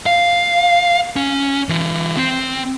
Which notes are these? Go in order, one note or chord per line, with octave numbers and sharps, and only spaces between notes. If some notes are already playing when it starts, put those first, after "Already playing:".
F5
C#4
E3 F4
C4